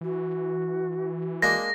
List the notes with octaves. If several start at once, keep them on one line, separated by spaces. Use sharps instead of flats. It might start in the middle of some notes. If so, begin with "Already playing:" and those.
E3 F#4
G#3 A#3 D4 A#6